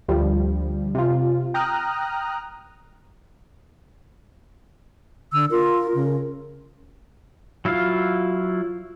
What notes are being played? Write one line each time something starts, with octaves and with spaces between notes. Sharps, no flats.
D2 F3 G3
C3 F4
G5 A#5 D#6 F6 F#6
D3 E6
F4 A#4
C#3
F#3 E4 F4 F5